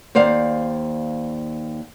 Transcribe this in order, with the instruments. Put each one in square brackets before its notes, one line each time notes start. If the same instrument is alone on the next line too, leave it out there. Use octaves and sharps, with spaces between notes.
[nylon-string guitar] D#2 C5 D5 F5